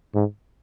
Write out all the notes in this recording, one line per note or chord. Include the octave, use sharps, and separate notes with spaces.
G#2